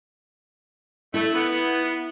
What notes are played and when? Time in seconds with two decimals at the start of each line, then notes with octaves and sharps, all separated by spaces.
1.14 A3 E4
1.34 B3